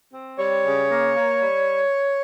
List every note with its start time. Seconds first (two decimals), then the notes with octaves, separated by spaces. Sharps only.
0.13 C4
0.38 G3 C#5
0.64 C#3
0.90 A#3
1.15 A#3
1.40 G3